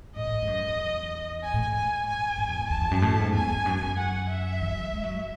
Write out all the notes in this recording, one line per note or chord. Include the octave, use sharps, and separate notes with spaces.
A2 D#5
A2
G#2
F#2
E2
G#5
A2
G#2
G#5
G#5
G#2
E2
E2 A5
E2
F#2
A2
G#2
E2 G#5
E2
F#2
F#2
F#5
E5
E3
F#3
F#3
G#3
F#3